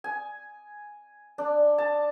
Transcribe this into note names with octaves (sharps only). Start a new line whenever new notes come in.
G#5
D4
A5